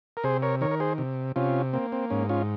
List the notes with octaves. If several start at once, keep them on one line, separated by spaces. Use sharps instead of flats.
A#4
C3 G#4 C5
A#4 C#5
D#3 A#4 C#5
A#4
G#4 C5
C3
C3 C#4 F4
A#3 C4
C4
G#2 C#4
C#4 F4